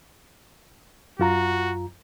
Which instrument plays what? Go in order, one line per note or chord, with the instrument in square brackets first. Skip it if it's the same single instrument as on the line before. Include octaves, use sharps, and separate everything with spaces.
[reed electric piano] F#2 F4 A#5 [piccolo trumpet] F#4